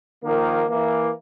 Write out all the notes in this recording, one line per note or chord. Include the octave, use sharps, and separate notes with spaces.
D#3 F3 A#3
E3 A#3